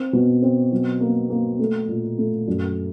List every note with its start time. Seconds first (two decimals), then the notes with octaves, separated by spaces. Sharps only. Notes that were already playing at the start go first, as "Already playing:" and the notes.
Already playing: C4
0.13 B2
0.42 C4
0.72 F#3
1.01 A#3
1.30 A#3
1.59 A3
1.88 A#2
2.18 A3
2.48 F#2